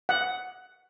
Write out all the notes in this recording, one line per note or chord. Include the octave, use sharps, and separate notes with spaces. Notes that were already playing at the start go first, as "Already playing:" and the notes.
F#5